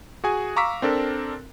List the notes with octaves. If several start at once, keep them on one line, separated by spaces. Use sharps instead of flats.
F#4 G#4 G#5
F5 A#5 C#6 D6 E6 B6
C4 D4 A4 A#4